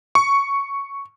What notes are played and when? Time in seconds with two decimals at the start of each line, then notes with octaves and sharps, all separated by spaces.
0.15 C#6